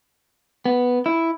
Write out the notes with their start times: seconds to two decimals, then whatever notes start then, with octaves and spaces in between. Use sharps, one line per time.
0.66 B3
1.06 E4